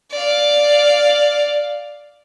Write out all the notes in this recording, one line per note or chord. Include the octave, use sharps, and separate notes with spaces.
D5 F5